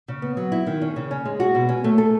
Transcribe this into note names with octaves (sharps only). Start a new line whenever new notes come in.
C#3
B3
F#3
E4
D#3
C#4
C#3
C#4
G#3
F#4
B2
C#4
A3
A4